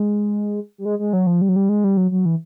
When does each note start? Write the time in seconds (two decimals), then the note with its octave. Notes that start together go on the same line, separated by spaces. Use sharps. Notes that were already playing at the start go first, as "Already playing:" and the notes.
Already playing: G#3
0.78 G3
0.85 G#3
0.99 G#3
1.13 F#3
1.27 F3
1.41 G3
1.49 F#3
1.56 G3
1.69 G#3
1.84 G3
1.97 F#3
2.11 F#3
2.25 E3